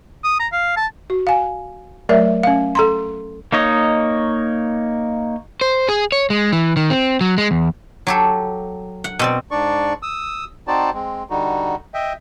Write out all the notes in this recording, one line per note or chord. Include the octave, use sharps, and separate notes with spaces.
D#6
A#5
F5
A5
F#4
F5 G#5
F#3 A3 A#4 D5 E5
C#4 F5
A4 A#5 C6
A#3 D#4 C#5 D#5
C5
G#4
C#5
G#3
E3
D#3
C4
F#3
G#3
E2
F#3 G4 A4
F#5
B2 C4 D5
G#2 D4 D5 C#6
D#6 E6
C4 D#4 F#4 C5 D5 A5
G#3 C4
D3 G3 D#4 F#4
D#5 E5 G5